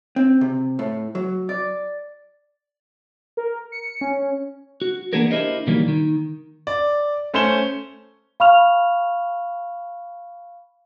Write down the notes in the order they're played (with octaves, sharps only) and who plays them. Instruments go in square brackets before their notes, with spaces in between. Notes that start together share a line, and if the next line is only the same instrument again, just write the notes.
[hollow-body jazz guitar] C4
C3
A2
F#3
D5
[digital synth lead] A#4
C#7
C#4
[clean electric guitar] F#4
E3 A#3 B3 D4 G#4 A#4
D4 E4 G4 A#4 C5 D#5
A#2 D#3 E3 F#3 G3 A#3
D#3
[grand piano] D5
A3 C#4 C5 C#7 E7 G7
[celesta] F5 B5 C#6 F6 F7